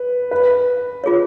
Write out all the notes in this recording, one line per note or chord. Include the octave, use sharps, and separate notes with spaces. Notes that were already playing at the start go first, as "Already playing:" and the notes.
Already playing: B4
B4
F4 G#4 C#5